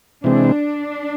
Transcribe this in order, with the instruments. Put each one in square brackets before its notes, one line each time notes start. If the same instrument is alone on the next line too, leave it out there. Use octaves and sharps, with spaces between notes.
[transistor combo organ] C3 E3 G#3 C4 [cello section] D4